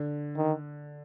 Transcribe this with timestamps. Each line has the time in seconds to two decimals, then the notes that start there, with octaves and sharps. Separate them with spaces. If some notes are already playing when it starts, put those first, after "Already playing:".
Already playing: D3
0.37 D#3